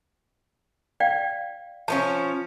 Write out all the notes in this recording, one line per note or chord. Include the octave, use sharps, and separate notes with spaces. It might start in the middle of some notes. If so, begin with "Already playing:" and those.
D5 F5 G5
F3 B3 C#4 A5